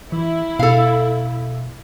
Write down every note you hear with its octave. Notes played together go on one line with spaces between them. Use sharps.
E3 E4
B2 A4 F5